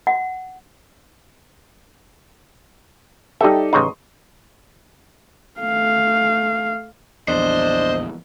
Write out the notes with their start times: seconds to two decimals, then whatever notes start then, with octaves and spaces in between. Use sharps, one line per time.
0.07 F#5
3.41 G3 D#4 G4 A4 E5
3.73 A1 C#3 D#4 C6 C#6 D#6
5.61 A3 F5
7.28 A#1 E2 D4 C5 D#5